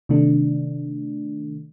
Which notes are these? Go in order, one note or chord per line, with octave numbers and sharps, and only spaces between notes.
C3 D#3 A3 D4